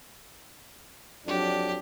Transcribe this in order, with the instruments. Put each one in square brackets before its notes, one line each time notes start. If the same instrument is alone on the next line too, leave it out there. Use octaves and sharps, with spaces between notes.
[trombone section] F2 F#3 D4 [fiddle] G4